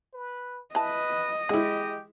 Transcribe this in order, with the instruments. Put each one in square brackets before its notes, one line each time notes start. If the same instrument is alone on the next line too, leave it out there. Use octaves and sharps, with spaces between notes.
[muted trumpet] B4
[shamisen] E3 A5 [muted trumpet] B4 [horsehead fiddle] D#5
[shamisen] D3 E3 [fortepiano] G#3 E4 [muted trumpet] G4